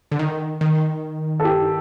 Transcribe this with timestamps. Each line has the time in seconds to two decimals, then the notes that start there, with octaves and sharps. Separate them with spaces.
0.11 D3
0.19 D#3
0.61 D#3
1.40 A4
1.45 G4